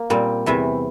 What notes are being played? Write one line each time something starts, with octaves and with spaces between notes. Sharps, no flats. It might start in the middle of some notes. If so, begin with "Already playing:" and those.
Already playing: A#3
A#2 G3 C4
E2 C3 E3 E5